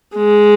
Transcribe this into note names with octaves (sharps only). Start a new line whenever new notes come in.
G#3